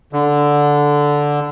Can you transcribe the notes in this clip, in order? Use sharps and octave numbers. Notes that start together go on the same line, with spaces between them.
D3